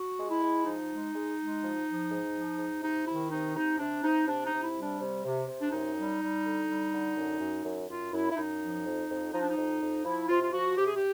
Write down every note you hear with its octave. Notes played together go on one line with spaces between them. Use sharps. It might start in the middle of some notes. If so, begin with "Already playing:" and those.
Already playing: F#4
G#3
E4
G#3
F3 D#4
G#3
G#3
G#3
F3
F3
G#2
F3
G#2
C3 D#4
D#3 E4
C3 D#4
C3 D#4
C3 D4
C3 D#4
C3 D4
D#4
C3
E4
G3
D4
C3
C3
C3
D4
F#2 D#4
G3
G3
D3
G3
D3
F#2
F#2
F#2
F#2 F4
F#2 E4
E4
F#2 D#4
F3
F2
F2
F3 D#4
D4
D#4
F2
F2
F3 E4
C3 F4
F4
F3 F#4
C3 G4
G#4
G4